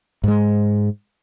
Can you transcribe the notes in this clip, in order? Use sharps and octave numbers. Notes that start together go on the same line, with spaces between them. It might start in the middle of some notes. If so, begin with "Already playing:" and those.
G#2 G#3